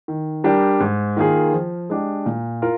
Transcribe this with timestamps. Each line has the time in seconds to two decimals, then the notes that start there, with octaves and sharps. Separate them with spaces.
0.08 D#3
0.44 G3 D4 G4 A#4
0.80 G#2
1.17 D#3 A#3 F4 G#4
1.53 F3
1.90 G#3 D4 G4
2.26 A#2
2.62 F4 A#4